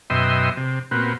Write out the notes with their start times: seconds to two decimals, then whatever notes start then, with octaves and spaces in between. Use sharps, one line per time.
0.10 F#2 B2 D#5 E5 G5 C6
0.57 C3
0.91 A#2 B3 C4 F#4